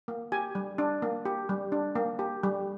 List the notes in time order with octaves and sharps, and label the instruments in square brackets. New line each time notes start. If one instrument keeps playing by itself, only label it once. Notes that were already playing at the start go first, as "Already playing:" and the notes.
[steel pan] A#3
G4 G#5
G3
D4
A#3
G4
G3
D4
A#3
G4
G3